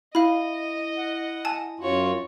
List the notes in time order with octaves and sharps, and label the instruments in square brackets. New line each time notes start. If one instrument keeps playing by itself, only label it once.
[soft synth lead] E4 [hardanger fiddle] D#5 [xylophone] F5 B5
[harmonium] F#5
[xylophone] G#5 A5
[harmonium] F#2 F4 [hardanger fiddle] F#4 C#5